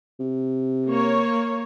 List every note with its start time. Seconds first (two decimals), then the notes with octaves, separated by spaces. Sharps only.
0.20 C3
0.88 A#3 C#5